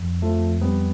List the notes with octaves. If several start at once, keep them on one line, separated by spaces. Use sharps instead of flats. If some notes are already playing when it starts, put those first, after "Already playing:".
Already playing: F2
F3 A3
G3 B3